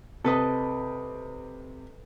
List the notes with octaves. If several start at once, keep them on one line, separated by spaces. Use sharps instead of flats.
C3 A4 B4 D#5